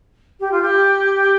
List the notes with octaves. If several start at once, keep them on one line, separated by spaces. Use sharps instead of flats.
G4
F4
G4